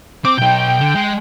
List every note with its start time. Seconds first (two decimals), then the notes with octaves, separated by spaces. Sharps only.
0.25 C4 D6
0.38 B1 D#4 G5
0.80 D3
0.95 G#3